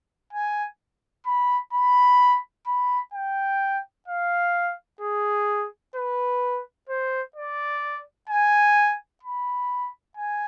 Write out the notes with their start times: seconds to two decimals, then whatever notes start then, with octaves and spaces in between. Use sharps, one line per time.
0.33 G#5
1.26 B5
1.73 B5
2.67 B5
3.14 G5
4.08 F5
5.01 G#4
5.96 B4
6.89 C5
7.36 D5
8.30 G#5
9.23 B5
10.17 G#5